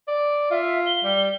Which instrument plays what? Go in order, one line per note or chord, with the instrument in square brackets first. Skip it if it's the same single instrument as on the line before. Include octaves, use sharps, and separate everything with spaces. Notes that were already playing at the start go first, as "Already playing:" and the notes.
[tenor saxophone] D5
[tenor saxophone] F4 [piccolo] E5
[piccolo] G7
[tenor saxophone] G3